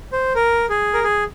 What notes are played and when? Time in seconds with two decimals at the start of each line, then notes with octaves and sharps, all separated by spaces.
0.12 C5
0.35 A#4
0.70 G#4
0.94 A#4
1.04 G#4